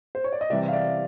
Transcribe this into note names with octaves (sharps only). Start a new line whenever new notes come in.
C5
C#5
D5
D#5
C3 E3 G3 D5 E5
F5
D5 E5